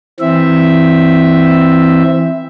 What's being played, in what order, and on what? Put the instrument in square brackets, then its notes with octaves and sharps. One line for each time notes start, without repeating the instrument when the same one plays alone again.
[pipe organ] E3 C4 E5